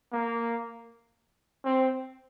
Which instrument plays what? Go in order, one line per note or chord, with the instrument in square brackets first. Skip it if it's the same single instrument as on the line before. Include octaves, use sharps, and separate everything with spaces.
[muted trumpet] A#3
C4